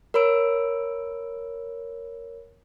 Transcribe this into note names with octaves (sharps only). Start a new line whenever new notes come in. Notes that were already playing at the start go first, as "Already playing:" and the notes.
A#4 C#5 B5 E6 D7